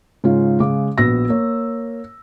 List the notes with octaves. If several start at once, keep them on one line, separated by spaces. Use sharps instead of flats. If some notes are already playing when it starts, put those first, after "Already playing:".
G#2 C#3 C#4 F4
C#3 G#3 F5 D6
A#1 B3 F#4 E6 A#6
A#3 C#5